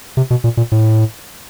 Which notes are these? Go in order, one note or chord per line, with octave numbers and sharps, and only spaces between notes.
C3
B2
A#2
A#2
A2